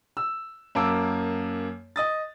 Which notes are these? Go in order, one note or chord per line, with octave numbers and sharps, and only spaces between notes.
E6
F#2 A#3 A5 D6 E6
D#5 D#6 A6